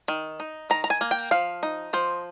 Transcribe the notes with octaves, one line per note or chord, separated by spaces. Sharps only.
D#3
D#4
D#3 A#5
A#5
G#5
A#3
G5
F3 F5
D#4
F3 C5